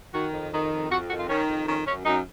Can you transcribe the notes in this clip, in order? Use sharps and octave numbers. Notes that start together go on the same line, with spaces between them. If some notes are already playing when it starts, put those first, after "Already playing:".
D#3 F#4
F2
D#3
F2
F2 F#4
D#3 F#4
F4
D#3 C#4
F2
D#3 C#4
F#2 C#4
F#2 D#4